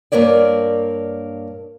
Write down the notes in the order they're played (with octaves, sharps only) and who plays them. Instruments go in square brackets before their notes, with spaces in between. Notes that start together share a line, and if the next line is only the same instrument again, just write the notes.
[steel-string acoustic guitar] G2 A#3 A#4 C#5 D5